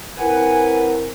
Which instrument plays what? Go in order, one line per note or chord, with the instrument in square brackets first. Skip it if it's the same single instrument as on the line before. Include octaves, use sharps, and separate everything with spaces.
[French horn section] C4 E4 A#4 [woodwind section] B4 F#5 G#5